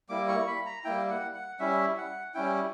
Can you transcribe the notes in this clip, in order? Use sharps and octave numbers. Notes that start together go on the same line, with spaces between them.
G3 A#3 E4 D6
C#6
B5
A#5
G3 A#3 E4 G5
F#5
F#5
G3 C#4 E4 E5
F#5
G3 C#4 E4 G5